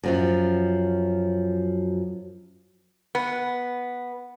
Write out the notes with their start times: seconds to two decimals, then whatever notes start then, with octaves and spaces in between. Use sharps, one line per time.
0.04 F#2 F3 F#3
3.15 B3